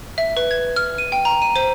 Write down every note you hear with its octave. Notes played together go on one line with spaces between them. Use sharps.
E5
B4
G#6
F6
D#7
G5
A#5
D#7
C5